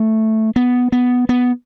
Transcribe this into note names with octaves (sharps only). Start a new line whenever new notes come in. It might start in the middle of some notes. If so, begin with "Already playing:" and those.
Already playing: A3
B3
B3
B3